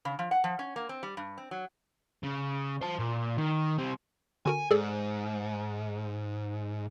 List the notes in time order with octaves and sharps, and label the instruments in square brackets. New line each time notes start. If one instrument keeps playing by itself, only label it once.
[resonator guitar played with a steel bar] C#3
F3
F#5
F3
C#4
A#3
C4
G3
G2
C4
F#3
[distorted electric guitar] C#3
C5 A5
A#2
D#3
G3 C4
[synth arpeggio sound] D3 F#4 A#4 [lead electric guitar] G#5
[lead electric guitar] G#2 [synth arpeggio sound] G#4 A4 D5